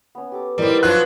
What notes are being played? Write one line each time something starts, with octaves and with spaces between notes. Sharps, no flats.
B3 C#4
G4 A4 D6
E3 G3 C4 D#4 A#4 B4 D5
F3 F#3 F4 F#6